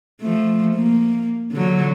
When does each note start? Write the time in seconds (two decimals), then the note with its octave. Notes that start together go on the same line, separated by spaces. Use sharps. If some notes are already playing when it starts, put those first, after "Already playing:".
0.21 F3 A3
0.75 A#3
1.52 D3 F#3